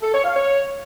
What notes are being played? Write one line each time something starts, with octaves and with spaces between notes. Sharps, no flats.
A4
C#5
F5
C#5